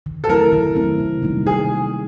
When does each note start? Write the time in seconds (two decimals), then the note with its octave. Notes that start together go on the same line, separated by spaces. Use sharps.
0.06 D#3
0.24 A4
0.28 F#3 A3 C4 E4 A#4
0.53 D#3
0.76 F#3 A3 C4 E4
1.00 C3
1.22 D#3 G3 A#3 D#4
1.46 C3 G#4